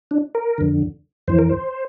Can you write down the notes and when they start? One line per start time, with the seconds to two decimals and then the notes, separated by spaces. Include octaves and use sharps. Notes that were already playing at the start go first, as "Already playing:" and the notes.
0.11 D4
0.35 A#4
0.58 F2 D3
1.28 F2 E3 C5
1.39 A#4
1.49 C5